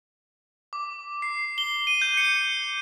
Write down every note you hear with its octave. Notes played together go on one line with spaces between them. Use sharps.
D6
C7
G7
D#7
G6
C#7